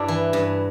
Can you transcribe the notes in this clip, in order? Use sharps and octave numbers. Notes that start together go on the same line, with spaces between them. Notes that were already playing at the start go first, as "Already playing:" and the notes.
Already playing: G2 D4 E4 D5
E3
G2